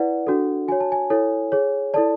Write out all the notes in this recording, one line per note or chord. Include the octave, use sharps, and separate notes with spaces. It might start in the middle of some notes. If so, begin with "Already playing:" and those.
Already playing: E4 B4 D5 F#5
D4 F#4 A4
F#4 C#5 G#5
A5
G#5
E4 A4 C#5
G#4 C#5
E4 A4 D5 A5